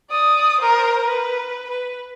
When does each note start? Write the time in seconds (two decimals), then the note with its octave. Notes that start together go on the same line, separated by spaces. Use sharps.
0.11 D5 D#6
0.60 A#4 C5
1.05 B4
1.70 B4